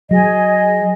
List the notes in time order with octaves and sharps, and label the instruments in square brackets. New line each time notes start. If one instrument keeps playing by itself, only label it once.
[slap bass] F#3 [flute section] G#4 D#5 G#5